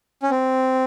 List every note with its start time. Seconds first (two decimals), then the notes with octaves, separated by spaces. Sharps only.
0.22 C#4
0.30 C4